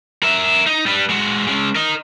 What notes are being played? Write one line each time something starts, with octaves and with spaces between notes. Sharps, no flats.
A#4 E5
D#4
G3 B4
G#3 F#4
G#3 C#4
A#4 D#5